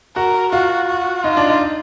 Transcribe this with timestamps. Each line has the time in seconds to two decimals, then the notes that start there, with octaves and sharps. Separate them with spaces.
0.16 F#4 A#4
0.53 F4 F#4
0.88 F#4
1.24 D#4 F4
1.37 D4
1.48 D#4